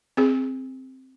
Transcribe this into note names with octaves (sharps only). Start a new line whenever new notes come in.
C4 G#4